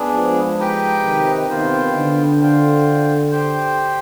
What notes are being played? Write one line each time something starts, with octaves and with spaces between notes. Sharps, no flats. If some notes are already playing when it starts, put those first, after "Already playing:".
Already playing: B3 D4 G#4
F3 G#3
D#4 G4 B4 D#5 G5
C3 D#3
C3 D#3 B3 F4 C5 G5
D3
F4 C5 G5
G4 C5 G5